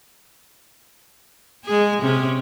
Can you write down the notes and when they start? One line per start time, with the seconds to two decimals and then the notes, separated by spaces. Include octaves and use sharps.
1.65 G#3 G#4
2.02 C3 C#4